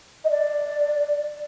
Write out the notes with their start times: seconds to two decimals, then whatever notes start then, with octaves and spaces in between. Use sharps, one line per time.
0.24 D#5
0.30 D5